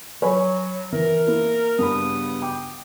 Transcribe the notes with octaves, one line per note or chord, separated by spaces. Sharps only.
F#3 C#5 G#5 B5
E3 A#4
A#3 E4
G2 C#3 B3 B5 D#6
G5 D6